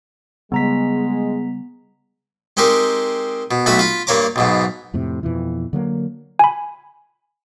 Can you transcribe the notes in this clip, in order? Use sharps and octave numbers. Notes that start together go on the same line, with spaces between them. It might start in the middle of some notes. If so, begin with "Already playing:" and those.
C#3 G3 G#3 B3 A#5 B6
G#3 C4 D#4 G4 A#4
B2
B1 A3 F#4 B5
F4 B5
G2 A#3 C#5 A#5 D6
B1 G#2 B2
F2 A2 C3
F2 B2 E3
D3 F#3 A#3
G#5 B5